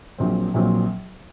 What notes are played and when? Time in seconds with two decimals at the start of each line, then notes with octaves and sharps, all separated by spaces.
0.18 A#1 A#2 F#3 C4
0.54 A#1 A#2 F#3 C4